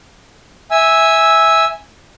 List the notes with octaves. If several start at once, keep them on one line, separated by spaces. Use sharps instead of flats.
E5 G#5 E6